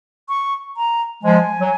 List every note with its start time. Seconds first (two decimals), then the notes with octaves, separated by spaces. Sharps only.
0.29 C#6
0.77 A#5
1.24 F3 G#3 G#5
1.61 F#3